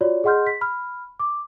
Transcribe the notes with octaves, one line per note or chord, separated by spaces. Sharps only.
F4 F#4 C#5 D5
G#4 D#5 F#5 C6 F6 G6
B6
B5 F6
D6